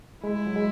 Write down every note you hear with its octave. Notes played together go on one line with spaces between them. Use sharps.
G#3 E4
F#3
G#3